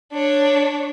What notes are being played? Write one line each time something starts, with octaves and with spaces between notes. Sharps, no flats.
D4 C#5